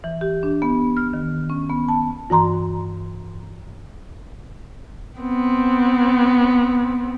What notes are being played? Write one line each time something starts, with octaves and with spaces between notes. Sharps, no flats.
E3
G4
D4
B3
F6
D#3
C#4
B3
A5
G2 E3 A#5 C6
B3 C4